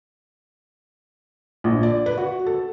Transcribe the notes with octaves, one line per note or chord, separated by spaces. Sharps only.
A#1
D5
B4
F#4
A4